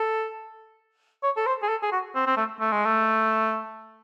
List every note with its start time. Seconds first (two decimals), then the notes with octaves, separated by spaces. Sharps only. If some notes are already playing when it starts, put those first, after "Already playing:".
Already playing: A4
1.23 C#5
1.37 A4
1.47 C5
1.63 G#4
1.69 A4
1.82 G#4
1.92 F#4
2.15 C4
2.27 C4
2.37 A3
2.60 A3
2.72 G#3
2.85 A3